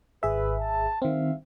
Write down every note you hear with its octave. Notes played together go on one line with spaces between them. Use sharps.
G#1 G#4 B4 E5
A5
G2 D#3 C4 E5 F5